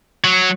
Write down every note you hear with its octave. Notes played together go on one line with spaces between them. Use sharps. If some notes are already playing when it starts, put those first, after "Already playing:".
F#3